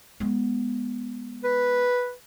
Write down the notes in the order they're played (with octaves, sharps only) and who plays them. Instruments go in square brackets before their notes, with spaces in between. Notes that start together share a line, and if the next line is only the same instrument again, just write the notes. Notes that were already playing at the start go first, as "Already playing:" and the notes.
[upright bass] G#3 B3
[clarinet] B4